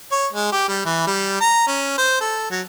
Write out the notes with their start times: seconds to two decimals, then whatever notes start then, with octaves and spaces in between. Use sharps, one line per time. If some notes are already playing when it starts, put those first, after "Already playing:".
0.12 C#5
0.33 G#3
0.52 G4
0.69 G3
0.85 E3
1.07 G3
1.41 A#5
1.67 C#4
1.98 C5
2.21 A4
2.51 F#3